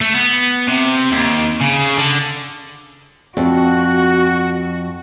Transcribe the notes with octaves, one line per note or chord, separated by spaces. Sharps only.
A3
B3
C3
D#2
C#3
D3
F2 F#4